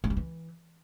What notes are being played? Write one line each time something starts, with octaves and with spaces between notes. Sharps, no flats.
A3
G3
E3